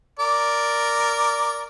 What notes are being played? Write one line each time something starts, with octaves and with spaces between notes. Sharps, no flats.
A#4 D5